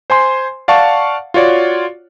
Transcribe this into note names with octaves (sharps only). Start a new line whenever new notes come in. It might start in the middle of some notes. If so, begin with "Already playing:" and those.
C5 G#5 C6
D5 F5 F#5 A5 C#6
F4 F#4 C#5 D5